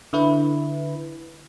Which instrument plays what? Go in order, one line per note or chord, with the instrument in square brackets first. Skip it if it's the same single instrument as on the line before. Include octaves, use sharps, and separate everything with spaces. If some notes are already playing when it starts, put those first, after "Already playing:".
[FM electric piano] D3 E4 B4